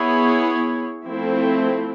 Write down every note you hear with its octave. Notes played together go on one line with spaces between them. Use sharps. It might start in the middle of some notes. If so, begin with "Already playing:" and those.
Already playing: B3 E4 G#4 C#5
F3 A3 C4 E4